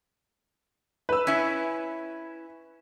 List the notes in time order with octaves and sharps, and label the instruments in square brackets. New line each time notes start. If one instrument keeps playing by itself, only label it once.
[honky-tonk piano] B4 E6
[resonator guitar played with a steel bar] C#4 E4